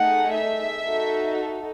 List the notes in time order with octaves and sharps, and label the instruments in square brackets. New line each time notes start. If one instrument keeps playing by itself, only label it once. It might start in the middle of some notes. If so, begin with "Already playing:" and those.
Already playing: [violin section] A3 D#4 G#4 F#5
E5
D#4 F#4 A4